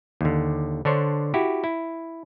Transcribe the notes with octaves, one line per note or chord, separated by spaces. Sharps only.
D#2 D3
D3 D4 C5 C#5
E4 F#4 G4
E4